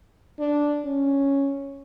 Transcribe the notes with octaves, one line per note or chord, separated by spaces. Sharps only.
D4
C#4